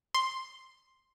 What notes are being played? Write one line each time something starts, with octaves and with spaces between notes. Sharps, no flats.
C6